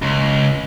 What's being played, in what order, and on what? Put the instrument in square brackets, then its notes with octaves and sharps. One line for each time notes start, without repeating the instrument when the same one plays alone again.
[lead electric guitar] C#2